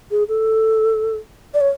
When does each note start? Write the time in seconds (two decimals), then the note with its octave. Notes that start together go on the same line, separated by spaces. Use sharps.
0.11 G#4
0.29 A4
1.54 D5
1.61 C#5